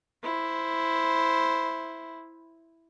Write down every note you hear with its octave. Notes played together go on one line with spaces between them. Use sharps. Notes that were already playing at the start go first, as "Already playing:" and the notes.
E4 C5